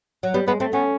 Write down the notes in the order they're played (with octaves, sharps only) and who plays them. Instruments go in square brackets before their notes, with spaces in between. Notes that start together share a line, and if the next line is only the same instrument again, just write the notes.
[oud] F#3
[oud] G3 [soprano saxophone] B3
[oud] G#3 [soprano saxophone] B3
[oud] A3 [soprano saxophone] C4
[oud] B3 [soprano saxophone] C#4